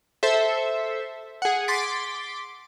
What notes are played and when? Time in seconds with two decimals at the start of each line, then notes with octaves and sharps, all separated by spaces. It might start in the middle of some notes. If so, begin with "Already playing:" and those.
0.23 A4 C5 E5
1.42 G#4 F#5
1.68 C6 D6 A6 B6 D7